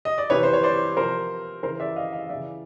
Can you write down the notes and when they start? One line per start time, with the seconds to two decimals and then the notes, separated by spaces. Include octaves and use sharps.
0.05 D#5
0.18 D5
0.30 C3 E3 B4 C#5
0.43 C5
0.53 C#5
0.63 C5 D5
0.97 C3 F3 A#4 C5
1.63 C#3 E3 A#4 C5
1.80 D5 E5
1.96 D#5 F5
2.13 D#5 F5
2.29 C#3 E3 D5 E5